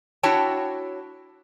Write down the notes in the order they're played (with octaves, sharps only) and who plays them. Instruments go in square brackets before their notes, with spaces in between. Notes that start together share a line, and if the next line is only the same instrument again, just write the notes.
[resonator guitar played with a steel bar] D4 E4 F#4 C#5 G5 A5